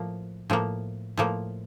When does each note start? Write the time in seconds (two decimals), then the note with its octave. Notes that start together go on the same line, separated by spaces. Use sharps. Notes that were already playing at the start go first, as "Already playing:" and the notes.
Already playing: A2 F3 A#3
0.50 A2 F3 A#3
1.17 A2 F3 A#3